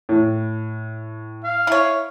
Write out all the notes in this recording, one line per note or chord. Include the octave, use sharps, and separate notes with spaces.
A2
F5
E4 C#5